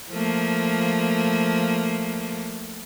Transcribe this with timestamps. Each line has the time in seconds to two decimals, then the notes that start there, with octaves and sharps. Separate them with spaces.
0.11 F3 A3 A#3